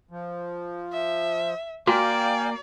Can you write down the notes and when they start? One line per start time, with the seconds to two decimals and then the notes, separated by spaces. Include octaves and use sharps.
0.11 F3
0.92 E5
1.87 A#3 F#4 D5 F5 G5 G#5